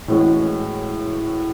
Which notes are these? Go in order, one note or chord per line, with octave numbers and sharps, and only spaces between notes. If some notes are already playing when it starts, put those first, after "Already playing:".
A2 E3 G#3 C#4 F#4